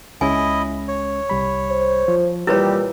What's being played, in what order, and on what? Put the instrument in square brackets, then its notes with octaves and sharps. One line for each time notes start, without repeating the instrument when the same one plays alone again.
[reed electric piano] C#2 G#3 C#4 [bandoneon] E4 D#5 [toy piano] G#5
[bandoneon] C#5
[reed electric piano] C2 G3 B5
[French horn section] C5
[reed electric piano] F3
[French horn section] A#2 E3 G3 [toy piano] E4 B4 C#5 [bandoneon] G4 [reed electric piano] E6